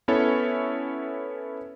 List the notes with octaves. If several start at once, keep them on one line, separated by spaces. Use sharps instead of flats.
B3 C#4 E4 A4 C#5